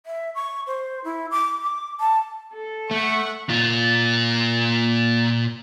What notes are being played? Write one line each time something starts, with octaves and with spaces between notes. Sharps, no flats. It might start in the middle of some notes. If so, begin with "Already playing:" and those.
E5
C#6
C5
E4
D6
D6
A5
A4
A3 E5 F#5 C#6
A#2 F4